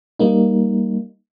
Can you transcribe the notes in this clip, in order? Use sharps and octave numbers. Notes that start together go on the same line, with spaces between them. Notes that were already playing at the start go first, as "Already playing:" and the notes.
G3 A#3 D#4